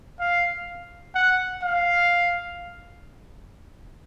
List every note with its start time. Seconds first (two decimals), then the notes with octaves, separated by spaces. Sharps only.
0.20 F5
1.15 F#5
1.62 F5